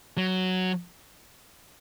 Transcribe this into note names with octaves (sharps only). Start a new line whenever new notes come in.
F#3